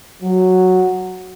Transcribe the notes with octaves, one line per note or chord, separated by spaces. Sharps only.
F#3